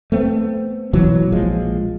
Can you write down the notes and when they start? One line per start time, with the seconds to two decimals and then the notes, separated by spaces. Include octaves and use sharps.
0.12 A3 B3 C4
0.93 B2 E3 F#3 B3
1.32 A#1 F3 G#3